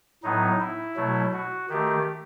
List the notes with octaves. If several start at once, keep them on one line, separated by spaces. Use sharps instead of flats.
A2 F#3 B3 D#4
E4
B2 F#3 A3
F#4
D#3 A3 G4